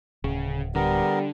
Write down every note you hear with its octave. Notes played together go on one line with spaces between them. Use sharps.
D1 C#3
D3 G3 B3 A#4